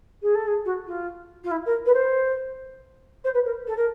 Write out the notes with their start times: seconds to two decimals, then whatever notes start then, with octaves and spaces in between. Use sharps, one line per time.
0.22 G#4
0.35 A4
0.47 G#4
0.65 F#4
0.87 F4
1.44 F4
1.51 E4
1.65 A#4
1.86 B4
1.94 C5
3.24 C5
3.34 B4
3.45 A#4
3.67 A4
3.76 A#4